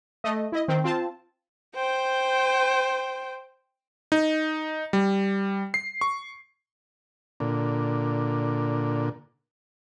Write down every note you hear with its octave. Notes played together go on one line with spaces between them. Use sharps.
A3 D#5
E4 D#5
D#3 C4
C4 F4 A5
C5 G5
D#4
G3
C7
C#6
A#2 D3